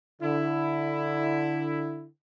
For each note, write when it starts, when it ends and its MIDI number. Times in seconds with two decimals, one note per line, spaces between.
0.22 2.07 50
0.22 2.07 64